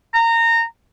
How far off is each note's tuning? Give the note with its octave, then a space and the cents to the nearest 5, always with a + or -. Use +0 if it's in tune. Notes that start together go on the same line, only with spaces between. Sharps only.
A#5 -20